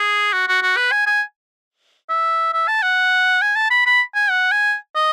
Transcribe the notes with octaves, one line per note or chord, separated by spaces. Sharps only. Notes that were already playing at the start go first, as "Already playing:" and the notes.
Already playing: G#4
F#4
F#4
F#4
B4
G#5
G#5
E5
E5
A5
F#5
G#5
A5
B5
B5
G#5
F#5
G#5
D#5